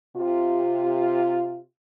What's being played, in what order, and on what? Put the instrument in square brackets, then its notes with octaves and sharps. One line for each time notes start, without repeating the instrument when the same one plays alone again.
[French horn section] C3 F4